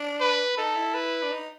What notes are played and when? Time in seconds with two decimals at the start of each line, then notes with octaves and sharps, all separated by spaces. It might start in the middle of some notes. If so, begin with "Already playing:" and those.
Already playing: D4
0.21 B4
0.58 D#4 A4
0.76 E4
0.94 B4
1.23 D4
1.32 D#4